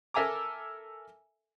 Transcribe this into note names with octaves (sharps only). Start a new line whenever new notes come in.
A4 A#4 E5 G#5 A#5 D6